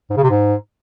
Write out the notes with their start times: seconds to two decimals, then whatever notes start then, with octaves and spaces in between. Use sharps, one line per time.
0.10 G#2
0.17 C#3
0.23 C3
0.30 G#2